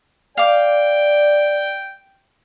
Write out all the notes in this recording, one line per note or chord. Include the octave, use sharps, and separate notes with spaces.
D5 F5 G5 D6